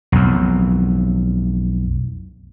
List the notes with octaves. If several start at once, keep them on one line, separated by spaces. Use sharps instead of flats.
B1 F2